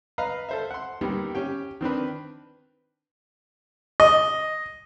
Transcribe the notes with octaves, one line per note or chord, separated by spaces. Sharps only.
B4 D#5 F5 A#5
A4 C5 E5
F#5 C6
D#2 D#3 G3 B3
C#4 G4 G5
D#3 C4 D4 B4
D#5